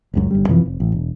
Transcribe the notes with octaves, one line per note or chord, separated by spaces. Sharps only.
F#1 C#2 F#2
G1 G3
F#2 C3 E3 F3
F1
A1
E1